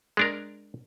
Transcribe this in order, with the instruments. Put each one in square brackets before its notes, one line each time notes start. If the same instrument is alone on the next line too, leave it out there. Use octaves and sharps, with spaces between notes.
[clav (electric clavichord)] G#3 D4 A#4